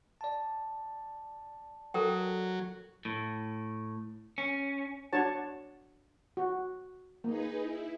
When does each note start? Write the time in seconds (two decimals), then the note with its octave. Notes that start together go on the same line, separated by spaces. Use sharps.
0.21 D5 A5
1.94 F#3 A4 A#4 G5
3.05 A2
4.38 C#4
5.13 D4 F#4 C#5 A5
6.37 F#4
7.24 A#3 D#4 G#4 B4
7.61 E4